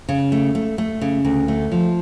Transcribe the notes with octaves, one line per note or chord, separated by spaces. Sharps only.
C#3
A3
A3
A3
C#3
D2
A3
F3